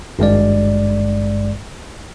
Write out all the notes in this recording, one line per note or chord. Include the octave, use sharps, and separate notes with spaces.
G#1 G2 G#3 D5